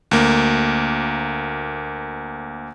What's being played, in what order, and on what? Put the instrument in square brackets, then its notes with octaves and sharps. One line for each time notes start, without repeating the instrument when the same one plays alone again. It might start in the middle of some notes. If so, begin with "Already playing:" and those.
[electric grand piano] D2 A#3